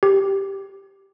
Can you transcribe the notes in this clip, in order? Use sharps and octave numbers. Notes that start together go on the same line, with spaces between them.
G4